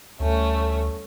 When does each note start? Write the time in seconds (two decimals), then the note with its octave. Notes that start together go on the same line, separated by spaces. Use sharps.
0.20 D2 G3 A3 C#4